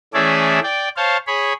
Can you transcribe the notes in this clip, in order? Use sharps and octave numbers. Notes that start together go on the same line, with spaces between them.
E3 A3 C#4 G#4 D5 E5
D5 G5
C5 C#5 F5 A5
G#4 C#5 B5